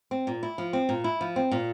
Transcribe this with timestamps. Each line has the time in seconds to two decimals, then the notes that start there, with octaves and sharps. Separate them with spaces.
0.11 C4
0.27 A#2
0.43 E4
0.58 F3
0.73 C4
0.89 A#2
1.04 E4
1.21 F3
1.36 C4
1.52 A#2